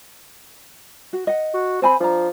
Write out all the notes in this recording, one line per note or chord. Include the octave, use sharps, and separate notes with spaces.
F#4
D#5 F#5
F#4
C4 C5 G#5 B5
F3 D4 A#5